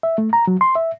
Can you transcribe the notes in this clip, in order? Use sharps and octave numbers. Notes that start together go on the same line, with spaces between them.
E5
A3
A#5
F#3
C6
E5